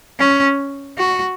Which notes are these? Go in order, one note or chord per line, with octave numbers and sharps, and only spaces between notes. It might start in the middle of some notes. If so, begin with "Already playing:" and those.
C#4
F#4